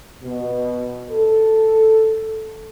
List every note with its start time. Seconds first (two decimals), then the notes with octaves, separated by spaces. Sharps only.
0.24 B2
1.10 A4